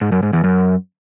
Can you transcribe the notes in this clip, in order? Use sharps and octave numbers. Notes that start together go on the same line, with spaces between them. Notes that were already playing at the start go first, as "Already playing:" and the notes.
G#2
F#2
G#2
E2
F#2